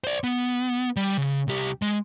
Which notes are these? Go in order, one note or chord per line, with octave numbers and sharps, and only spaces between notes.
C5 D5
B3
G3
C#3
C2 G4
G#3